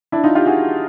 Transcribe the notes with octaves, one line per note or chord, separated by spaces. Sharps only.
D4 E4
D#4 F4
F4 G4
F#4 G#4